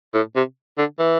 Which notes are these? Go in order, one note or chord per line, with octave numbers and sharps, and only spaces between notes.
A2
C3
D3
E3